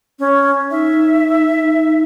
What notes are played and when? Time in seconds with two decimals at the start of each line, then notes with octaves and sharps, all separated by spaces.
0.19 C#4
0.71 D#4 E5